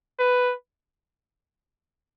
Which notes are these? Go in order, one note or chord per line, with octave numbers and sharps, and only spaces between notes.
B4